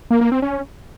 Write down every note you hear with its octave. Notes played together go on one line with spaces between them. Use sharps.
A#3
A#3
C4
C#4